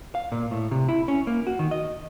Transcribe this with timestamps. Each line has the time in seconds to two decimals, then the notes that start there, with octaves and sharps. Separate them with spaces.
0.15 F5
0.32 A#2
0.51 A2
0.71 C3
0.89 E4
1.08 C#4
1.27 A#3
1.47 F#4
1.59 D#3
1.71 D#5